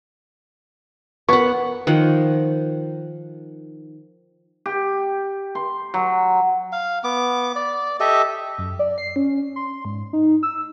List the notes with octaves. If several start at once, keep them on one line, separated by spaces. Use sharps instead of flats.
B3 A#4 F#5 C#6
D#3 F3 F#5
G4
C6
F#3
F5
B3 D6
D5
G4 A4 D#5 E5
F#2
D5
C7
C#4
C6
G#2
D#4
E6